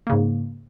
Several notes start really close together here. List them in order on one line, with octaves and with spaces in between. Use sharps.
A#3 C#3 G#2